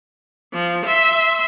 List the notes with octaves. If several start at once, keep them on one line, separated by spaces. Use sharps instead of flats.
F3
E5 C6